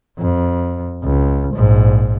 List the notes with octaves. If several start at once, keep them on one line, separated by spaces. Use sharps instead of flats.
F2
C#2
A#1 G#2